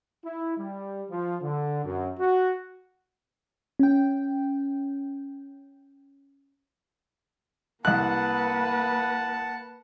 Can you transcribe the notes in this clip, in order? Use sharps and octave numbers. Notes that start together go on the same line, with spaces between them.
E4
G3
F3
D3
F#2
F#4
C#4 G5
C2 A#3 B4 F#5 A5 F#6